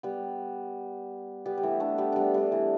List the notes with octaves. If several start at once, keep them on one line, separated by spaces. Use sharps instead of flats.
G3 B3
G3 B3
G3
E3 A3
A3 D4
G3 B3
G3 B3 D4
G3
E3